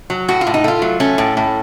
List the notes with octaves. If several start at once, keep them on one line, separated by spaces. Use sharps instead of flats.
F#3
A2 F#4
F4
A2
D#4
A3 F4
F#3
A3 C#4
A2
A2